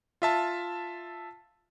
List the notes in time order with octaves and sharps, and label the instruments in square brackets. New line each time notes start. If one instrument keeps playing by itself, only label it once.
[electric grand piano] F4 E5 A5